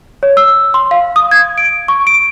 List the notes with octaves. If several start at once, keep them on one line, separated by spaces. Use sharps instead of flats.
C#5
E6
C6
F5
D#6
G#6
D7
C#6
D7